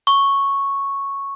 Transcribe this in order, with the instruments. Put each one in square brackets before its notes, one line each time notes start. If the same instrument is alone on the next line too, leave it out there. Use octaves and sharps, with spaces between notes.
[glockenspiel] C#6